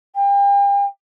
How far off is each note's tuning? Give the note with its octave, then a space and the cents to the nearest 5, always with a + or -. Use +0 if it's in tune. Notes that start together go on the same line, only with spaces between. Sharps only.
G5 +40